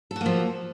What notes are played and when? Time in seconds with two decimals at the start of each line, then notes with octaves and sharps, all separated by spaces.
0.11 A4
0.16 F#4
0.21 A#3
0.26 F3